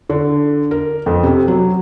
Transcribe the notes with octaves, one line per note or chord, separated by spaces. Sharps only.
D3
A#4
F2
C3
F#3